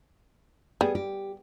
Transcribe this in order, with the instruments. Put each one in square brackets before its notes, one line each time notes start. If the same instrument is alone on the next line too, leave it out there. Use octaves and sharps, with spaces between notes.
[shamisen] G3 [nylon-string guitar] B3 G#4
[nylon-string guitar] G4